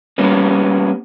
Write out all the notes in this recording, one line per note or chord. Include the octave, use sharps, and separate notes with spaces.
G3 A#3 B3 C#4